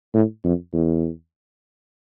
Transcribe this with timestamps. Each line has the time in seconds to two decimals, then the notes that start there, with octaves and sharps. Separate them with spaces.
0.14 A2
0.44 F2
0.73 E2